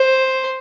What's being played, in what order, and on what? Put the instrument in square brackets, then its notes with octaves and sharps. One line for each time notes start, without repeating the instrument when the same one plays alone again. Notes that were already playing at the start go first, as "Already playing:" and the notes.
Already playing: [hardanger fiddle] C5